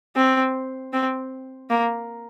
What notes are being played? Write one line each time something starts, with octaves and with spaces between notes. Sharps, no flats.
C4
C4
A#3